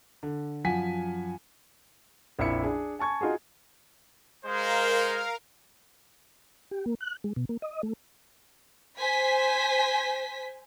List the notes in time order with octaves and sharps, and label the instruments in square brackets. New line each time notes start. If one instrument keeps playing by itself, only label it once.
[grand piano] D3
F#2 F3 F#5 G#5 B6
A#1 F2 E4 E5 B5 C#7
D4 G#4
G#5 A5 C#6 G#6
D#4 F4 F#4 G#4
[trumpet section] G#3 C5 [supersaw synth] A#4 F5
[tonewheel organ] G4
A#3
F#6
G#3
B2
A#3
D#5
A3
[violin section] C5 G#5 B6